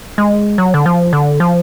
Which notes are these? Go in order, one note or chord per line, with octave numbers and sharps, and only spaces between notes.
G#3
F#3
D3
F3
D3
F3